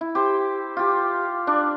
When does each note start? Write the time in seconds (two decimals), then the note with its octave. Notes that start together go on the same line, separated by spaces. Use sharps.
0.01 E4
0.15 G4 C5
0.77 F4 G4
1.47 D4 D5